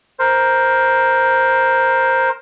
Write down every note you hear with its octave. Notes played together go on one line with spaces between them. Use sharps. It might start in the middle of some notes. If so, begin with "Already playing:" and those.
A#4 C5